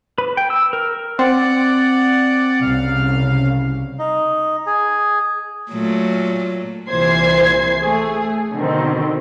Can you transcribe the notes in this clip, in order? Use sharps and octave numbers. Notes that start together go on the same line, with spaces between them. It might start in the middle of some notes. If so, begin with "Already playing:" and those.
B4
G5
E6
A#4
C4 D5 F#5
C2 C#3 F5
D#4
G#4
A#2 F#3 A3
C2 A#2 E3 C5 G#6 C7
A3 G#4
B2 D3 D#3 C4